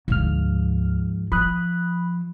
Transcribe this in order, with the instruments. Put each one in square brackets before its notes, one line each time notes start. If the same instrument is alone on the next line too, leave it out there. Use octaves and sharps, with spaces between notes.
[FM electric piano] D2 F6 [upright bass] G#2 F3
[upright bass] F3 [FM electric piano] B5 D#6 F#6